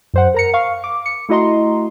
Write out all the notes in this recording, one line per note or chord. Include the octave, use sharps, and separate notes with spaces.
F#2 C5 F#5
A#4 A#5 C#7
F5 C#6
D6
C#7
A3 E4 F#4 D#5 A#5 C6